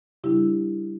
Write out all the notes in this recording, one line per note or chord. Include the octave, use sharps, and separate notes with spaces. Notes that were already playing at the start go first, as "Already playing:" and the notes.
C#3 G3 D4 E4 G4